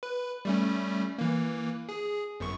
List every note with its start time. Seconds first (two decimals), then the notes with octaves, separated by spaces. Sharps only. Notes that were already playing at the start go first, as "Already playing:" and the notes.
0.03 B4
0.45 G3 A3 C#4
1.18 E3 A#3
1.89 G#4
2.40 G1 F#2 C#6